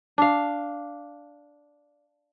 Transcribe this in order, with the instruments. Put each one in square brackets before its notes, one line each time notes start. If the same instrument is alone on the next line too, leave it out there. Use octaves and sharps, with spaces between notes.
[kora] D4 F5